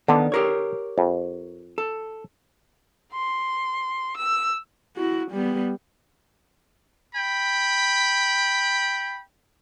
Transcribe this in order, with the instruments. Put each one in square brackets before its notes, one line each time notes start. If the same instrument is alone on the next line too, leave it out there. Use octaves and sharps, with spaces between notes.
[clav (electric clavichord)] D3 [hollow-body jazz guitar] D#3 B3
[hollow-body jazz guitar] G4 A#4 C#5
[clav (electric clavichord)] F2
[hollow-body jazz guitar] A4
[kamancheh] C6
E6
[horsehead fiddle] E4 F#4
G3 B3
[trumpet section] G5 B5